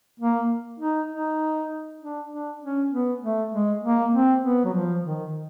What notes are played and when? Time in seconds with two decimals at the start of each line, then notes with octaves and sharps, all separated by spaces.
0.20 A#3
0.80 D#4
1.10 D#4
2.01 D4
2.31 D4
2.62 C#4
2.92 B3
3.22 A3
3.52 G#3
3.84 A#3
4.13 C4
4.44 B3
4.65 F#3
4.74 F3
5.04 D#3